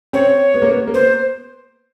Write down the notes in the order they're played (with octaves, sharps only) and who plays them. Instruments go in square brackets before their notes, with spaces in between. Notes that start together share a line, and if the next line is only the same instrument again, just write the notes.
[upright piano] C4 [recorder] C#5
[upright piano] B3
A#3
B3
A#3
[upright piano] B3 [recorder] C5